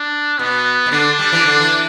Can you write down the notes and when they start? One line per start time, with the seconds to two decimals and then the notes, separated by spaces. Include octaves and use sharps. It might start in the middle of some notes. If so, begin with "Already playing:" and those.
Already playing: D4
0.39 B2 B3
0.86 B2
0.92 D3 D4
1.19 G3
1.32 E3
1.46 D3
1.60 E3